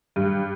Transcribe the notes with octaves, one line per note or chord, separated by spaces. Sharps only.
G2